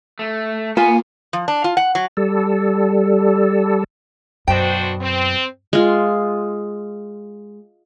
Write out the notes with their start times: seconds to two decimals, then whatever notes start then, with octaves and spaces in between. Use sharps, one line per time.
0.19 A3
0.77 A#3 B3 F4 G#5
1.33 F3
1.48 D4
1.64 F4
1.77 F#5
1.95 F#3
2.17 G3 A4
4.48 F#2 B2 D4 F#4 C5 G5
5.01 C4
5.73 G#3 F4